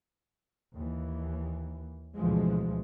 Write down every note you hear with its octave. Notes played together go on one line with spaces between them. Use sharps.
D#2 E3
D2 G#2 B2 E3 F3 G#3